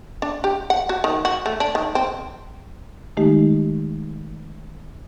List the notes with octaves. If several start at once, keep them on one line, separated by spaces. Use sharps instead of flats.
D4
G4
F#5
F#4
D#3
F#4
A3
D4
D#3
C4
D#3 G#3 A3 D#4 G4